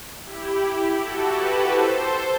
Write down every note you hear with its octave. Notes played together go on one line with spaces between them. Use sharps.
E4 G4
F#4 A4
G4 B4
A4 C5